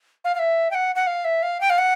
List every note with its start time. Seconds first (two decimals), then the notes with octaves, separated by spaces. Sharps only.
0.25 F5
0.35 F5
0.39 E5
0.71 G5
0.75 F#5
0.95 F#5
1.07 F5
1.25 E5
1.43 F5
1.61 G5
1.70 F5
1.78 F#5